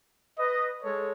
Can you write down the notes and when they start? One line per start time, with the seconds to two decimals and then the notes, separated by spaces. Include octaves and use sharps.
0.37 B4 D#5
0.84 G#3 A4 C#5